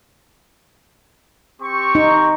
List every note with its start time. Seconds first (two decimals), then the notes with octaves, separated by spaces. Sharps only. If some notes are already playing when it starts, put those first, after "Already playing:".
1.61 C4 G4 C#6
1.95 D#4